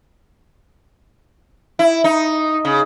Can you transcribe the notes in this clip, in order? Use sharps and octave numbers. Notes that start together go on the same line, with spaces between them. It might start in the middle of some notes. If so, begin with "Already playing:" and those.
E4
D#4
C#3